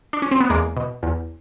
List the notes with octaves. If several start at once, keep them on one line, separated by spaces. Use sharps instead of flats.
D4
C#4
C4
B3
E2 G#3 A#3
B2
E2